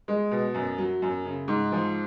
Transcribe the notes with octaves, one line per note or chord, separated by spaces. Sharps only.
G#3
B2
F#2
F#3
F#2
C#3
G#2
F3